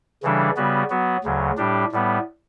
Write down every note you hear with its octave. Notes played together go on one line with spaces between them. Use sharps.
C#3 E3 G3 D4 A4
C#3 G3 B3 F#4
F#3 B3 F#4
D2 C#3 F#3
A2 G3 D4 G4
A2 G3 B3